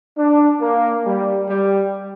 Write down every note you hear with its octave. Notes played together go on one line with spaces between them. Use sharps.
D4
A#3
G3
G3